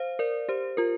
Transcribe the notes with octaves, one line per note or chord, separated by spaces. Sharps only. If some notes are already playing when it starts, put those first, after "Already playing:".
Already playing: C5 F5
A#4 D5
G4 C5
F4 A#4